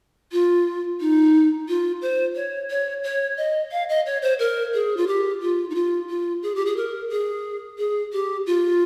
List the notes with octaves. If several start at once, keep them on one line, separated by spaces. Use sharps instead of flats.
F4
D#4
F4
C5
C#5
C#5
C#5
D#5
F5
D#5
C#5
C5
A#4
G#4
F4
G4
F4
D#4
F4
F4
G#4
G4
G#4
A#4
G#4
G#4
G4
F4